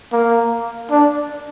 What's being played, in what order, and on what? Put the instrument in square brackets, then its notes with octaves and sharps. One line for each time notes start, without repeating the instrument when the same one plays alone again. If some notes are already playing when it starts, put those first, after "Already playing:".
[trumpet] A#3
D4